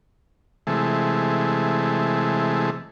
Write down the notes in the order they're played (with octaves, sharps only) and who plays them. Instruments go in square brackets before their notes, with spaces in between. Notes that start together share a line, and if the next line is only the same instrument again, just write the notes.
[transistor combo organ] C3 E3 G#3 A3